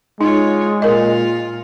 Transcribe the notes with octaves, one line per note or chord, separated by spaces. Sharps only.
G#3 D#4 F4 C#5
A#2 F4 A#4 D#5